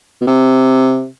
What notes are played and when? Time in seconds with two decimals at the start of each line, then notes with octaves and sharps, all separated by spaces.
0.21 B2
0.27 C3